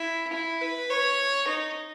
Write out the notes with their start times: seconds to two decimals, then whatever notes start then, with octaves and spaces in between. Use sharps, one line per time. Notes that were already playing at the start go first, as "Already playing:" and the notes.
Already playing: E4
0.32 E4
0.61 B4
0.90 C#5
1.48 D#4